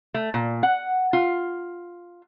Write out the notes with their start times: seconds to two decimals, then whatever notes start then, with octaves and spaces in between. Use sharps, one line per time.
0.14 A3
0.34 A#2
0.63 F#5
1.13 F4